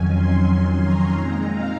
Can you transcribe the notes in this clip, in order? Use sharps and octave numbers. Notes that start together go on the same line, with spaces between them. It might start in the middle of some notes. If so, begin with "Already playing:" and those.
Already playing: F2 D#3 F#3 C#4 G#5
C6
A#5
A#2 G#3 C4 D#4
F5